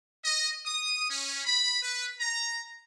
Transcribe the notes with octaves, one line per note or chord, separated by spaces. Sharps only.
D#5
D#6
C#4
B5
B4
A#5